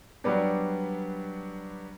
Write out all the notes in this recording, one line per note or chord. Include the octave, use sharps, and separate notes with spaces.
F#3 G3 B3 D4